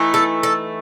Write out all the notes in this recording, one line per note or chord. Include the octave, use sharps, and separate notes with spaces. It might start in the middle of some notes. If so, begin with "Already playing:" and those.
Already playing: E3 A3 D#4
A4
A4